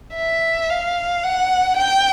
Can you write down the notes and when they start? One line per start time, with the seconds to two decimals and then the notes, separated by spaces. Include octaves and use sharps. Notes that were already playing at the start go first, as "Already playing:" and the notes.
0.16 E5
0.69 F5
1.23 F#5
1.77 G5